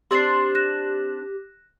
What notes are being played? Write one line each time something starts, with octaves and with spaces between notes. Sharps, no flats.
C4 D4 G4 C5 C6 A6 C7
F#6 A#6 E7